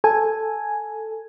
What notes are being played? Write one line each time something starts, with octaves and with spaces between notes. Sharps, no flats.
A4 G#5